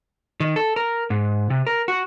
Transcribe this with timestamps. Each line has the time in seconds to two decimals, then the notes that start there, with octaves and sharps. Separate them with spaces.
0.40 D#3
0.56 A4
0.76 A#4
1.10 G#2
1.50 C3
1.67 A#4
1.88 F#4